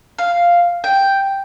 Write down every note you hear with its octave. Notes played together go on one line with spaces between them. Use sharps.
F5
G5